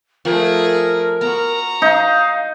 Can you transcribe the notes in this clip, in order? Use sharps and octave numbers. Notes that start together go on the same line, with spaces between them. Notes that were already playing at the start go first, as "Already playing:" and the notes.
F3 A3 G#4 A#4
B3 F#4 A#5
D#4 F5